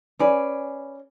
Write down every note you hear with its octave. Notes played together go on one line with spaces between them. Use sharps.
C#4 G#4 B4 D5